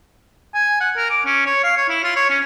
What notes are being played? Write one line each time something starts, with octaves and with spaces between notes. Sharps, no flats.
G#5
F#5
A#4
D6
C#4
C#5
F5
C#5
E4
F4
C#5
C#4